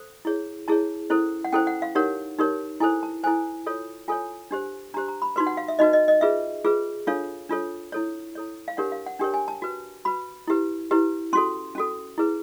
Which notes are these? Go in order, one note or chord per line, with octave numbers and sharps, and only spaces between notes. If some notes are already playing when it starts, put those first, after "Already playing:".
Already playing: A4 C5
E4 G#4 C#5
E4 G#4 C#5 A5
C#4 E4 A4 C5
F#5
C#4 E4 A4 C5 G5
F#5
F5
D#4 G4 A#4 C#5 F#5
D#4 G4 A#4 C#5
E4 A4 C5 G#5
A5
E4 A4 C5 G#5
F4 A4 C#5
F4 A4 C#5 G#5
D4 G4 C5
D4 G4 C5 A#5
A#5
B5
D#4 F#4 B4 C6
F#5
F5
E5
D#4 F#4 B4 D#5
D#5
D#5
F4 G#4 B4 E5
F4 G#4 B4
D4 F4 A4 C#5 F5
D4 F4 A4 C#5
E4 A4 C#5
E4 A4 C#5
F5
D4 G4 A#4 C#5 F#5
F5
F#5
D4 G4 A#4 C#5 G5
G#5
A5
F#4 B4
F#4 B4 B5
E4 G4 B4
E4 G4 B4
C#4 F#4 A4 C6
C#4 F#4 A4
E4 G#4 B4